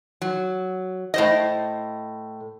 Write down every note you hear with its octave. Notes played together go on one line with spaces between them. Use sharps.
F#3
A2 C5 D#5